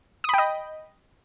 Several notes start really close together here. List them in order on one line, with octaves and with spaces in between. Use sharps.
D#6 B5 G5 D#5